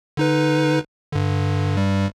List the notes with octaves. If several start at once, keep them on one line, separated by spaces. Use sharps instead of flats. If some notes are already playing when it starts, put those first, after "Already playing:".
D3 D#4 B4
G2 D3
G2 G3